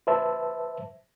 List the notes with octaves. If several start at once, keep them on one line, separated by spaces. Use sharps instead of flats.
B4 C5 E5 A5